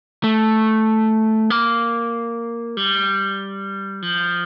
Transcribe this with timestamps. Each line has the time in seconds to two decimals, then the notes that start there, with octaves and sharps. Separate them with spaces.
0.24 A3
1.50 A#3
2.77 G3
4.02 F3